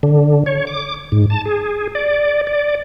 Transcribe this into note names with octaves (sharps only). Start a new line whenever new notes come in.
D3
C#5
D6
G#2
A5
G#4
D5
D5